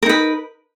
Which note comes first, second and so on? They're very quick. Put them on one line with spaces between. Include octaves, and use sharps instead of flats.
A#4 D#4 B4